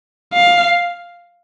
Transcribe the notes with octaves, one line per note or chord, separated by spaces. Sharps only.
F5